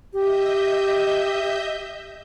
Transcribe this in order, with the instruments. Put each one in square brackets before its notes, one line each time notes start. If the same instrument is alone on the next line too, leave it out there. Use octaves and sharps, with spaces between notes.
[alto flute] G4 [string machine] D#5 E5 G6